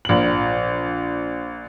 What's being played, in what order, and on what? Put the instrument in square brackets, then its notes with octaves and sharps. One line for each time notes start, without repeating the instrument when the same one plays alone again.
[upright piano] A#1 F#7